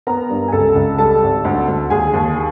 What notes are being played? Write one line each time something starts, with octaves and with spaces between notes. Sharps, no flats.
B3 A#4 A#5
G2
G#5
C#2 A4 A5
C#2
G3 A4 A5
G#1
D2
D2
D#2 G#4 G#5
D#2